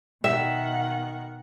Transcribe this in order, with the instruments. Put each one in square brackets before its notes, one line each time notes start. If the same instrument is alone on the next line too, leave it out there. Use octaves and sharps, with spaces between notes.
[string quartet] B2 D#3 F#5 [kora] E5 [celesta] G5